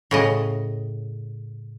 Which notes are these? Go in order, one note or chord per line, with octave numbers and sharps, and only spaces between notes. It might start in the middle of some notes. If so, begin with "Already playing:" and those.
A2 C#3 D#5